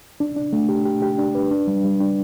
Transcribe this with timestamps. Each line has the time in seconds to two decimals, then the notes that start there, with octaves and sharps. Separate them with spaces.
0.20 D4
0.36 D4
0.53 A3
0.69 G4
0.85 G4
1.02 G4
1.18 D4
1.35 B4
1.51 D4
1.67 G3
1.84 G3
2.00 D4